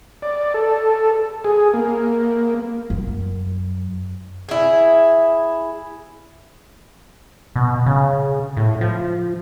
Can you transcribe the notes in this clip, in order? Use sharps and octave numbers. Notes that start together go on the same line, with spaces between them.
D5
A4
G#4
A#3
F#2
E4 G#4
B2
C#3
A2
F3